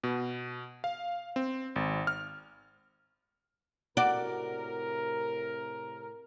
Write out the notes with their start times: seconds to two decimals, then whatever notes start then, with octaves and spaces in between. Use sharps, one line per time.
0.04 B2
0.84 F5
1.36 C4
1.76 G#1
2.07 F6
3.97 A2 C3 F#4 A#4 D5